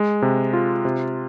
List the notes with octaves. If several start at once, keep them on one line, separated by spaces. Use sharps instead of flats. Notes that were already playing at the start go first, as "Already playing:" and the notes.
Already playing: G#3
C3
F4
C3